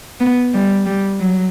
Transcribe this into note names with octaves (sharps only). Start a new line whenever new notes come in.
B3
G3
G3
F#3